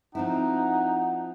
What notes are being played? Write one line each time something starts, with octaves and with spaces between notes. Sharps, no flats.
F3 C4 D#4 E4 F#5